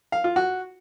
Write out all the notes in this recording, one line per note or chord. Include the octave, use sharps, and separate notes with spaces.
F5
F4
F#4